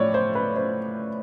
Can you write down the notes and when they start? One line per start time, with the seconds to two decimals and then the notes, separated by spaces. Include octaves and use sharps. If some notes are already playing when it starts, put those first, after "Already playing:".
Already playing: A2 F3 C#5 D5
0.14 C5
0.35 B4
0.56 C5